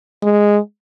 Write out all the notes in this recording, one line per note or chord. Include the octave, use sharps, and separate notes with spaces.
G#3